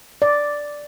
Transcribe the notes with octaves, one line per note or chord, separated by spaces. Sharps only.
D5